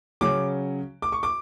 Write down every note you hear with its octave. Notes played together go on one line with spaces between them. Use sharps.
C#3 F#3 C#4 D6
D6
C#6
D6